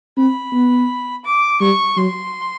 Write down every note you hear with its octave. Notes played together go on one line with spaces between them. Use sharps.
C4 B5
B3
D6
G3 C#6
F#3 C6